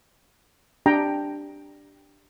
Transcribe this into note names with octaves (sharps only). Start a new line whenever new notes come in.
D4 G4 G5 A#5